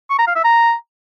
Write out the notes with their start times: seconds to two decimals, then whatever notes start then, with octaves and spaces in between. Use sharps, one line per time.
0.10 C#6
0.18 A#5
0.27 F5
0.35 E5
0.44 A#5